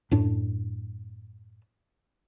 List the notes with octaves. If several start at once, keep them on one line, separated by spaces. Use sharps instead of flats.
F#2 A2 D4